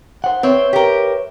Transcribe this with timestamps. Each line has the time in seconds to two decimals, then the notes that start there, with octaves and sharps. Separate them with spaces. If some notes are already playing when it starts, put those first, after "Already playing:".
0.24 C5 F#5
0.43 C4 B4 C#5 E5
0.73 G4 A#4